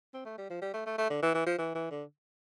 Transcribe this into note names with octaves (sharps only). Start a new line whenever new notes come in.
C4
A3
G3
F3
G3
A3
A3
A3
D3
E3
E3
F3
E3
E3
D3